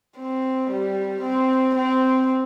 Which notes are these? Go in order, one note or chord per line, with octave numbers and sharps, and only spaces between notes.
C4
G3
C4
C4